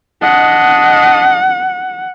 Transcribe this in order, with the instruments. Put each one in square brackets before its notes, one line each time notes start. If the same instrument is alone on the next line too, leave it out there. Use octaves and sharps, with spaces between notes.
[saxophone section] D4 D#5 [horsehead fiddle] F#5